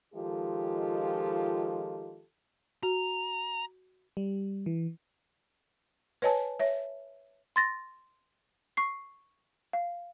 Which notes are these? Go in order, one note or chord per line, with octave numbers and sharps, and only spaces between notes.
D#3 F3 G#3 F4 G4 A4
F#4 A#5
G3
E3
B4 C#5 D#5 G#5 A5
C#5 E5
C6 A6 A#6
C#6 C7
F5